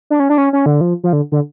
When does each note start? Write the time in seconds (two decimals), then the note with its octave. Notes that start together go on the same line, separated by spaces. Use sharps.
0.10 D4
0.20 C#4
0.30 D4
0.38 C#4
0.53 C#4
0.66 D3
0.81 F3
1.04 F3
1.13 D3
1.32 D3